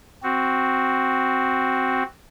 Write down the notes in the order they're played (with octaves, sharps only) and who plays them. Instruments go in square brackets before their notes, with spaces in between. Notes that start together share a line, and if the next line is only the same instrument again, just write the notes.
[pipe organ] C4 F#4